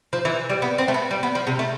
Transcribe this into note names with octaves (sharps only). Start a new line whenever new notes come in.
F3
E3
G3
B3
C4
A3
B3
G3
B3
F3
C3
A3